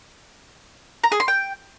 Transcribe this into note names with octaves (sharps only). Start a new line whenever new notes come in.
A#5
G#4
C6
G5